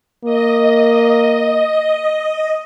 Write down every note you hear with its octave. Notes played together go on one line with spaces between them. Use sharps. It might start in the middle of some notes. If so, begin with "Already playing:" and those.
A#3 D#5